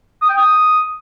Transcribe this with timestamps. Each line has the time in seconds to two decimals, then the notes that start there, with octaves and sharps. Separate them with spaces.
0.21 D#6
0.29 G5
0.37 D#6